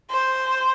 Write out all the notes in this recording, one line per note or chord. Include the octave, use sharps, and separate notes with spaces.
C5